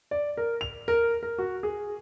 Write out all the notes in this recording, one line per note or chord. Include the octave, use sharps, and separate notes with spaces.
D5
A#4
F7
A#4
A#4
F#4
G#4